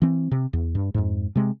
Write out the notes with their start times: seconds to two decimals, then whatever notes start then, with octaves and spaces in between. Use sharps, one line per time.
0.02 E3 C4
0.31 C3
0.53 E2
0.75 G2
0.94 F2 G#2
1.35 C3 G#3